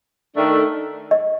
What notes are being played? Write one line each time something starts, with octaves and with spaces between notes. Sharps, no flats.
D#3 A3 D4
D#5